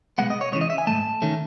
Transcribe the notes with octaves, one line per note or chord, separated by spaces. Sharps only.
B2 G#3 B3 F#5
D#5
C#5
C#2 C#3 E3 C#5
D#5
E5
G#5
G#2 D#3 A3 A5
D#3 A3 C#4